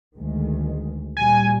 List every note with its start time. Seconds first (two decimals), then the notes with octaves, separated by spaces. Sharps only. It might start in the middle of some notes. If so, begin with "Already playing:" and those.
0.16 D2 D#3 G#3
1.17 A#2 G3 G#5